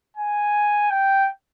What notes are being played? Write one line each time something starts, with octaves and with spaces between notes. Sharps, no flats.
G#5
G5